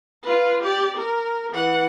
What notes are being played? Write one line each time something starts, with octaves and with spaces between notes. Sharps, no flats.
F4 B4
G4 D5
A#4
E3 F#5